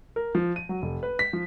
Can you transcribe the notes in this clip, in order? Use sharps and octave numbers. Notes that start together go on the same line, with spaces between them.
A#4
F3
D#7
F#3
F1
B4
B6
F3